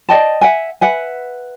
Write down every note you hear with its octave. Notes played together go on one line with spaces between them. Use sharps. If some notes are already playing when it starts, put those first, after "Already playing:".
D5 D#5 G5 A5
E5 F#5 G#5
B4 E5 F#5 G#5